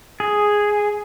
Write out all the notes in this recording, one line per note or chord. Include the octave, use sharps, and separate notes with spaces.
G#4